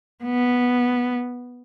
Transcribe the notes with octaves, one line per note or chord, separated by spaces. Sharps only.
B3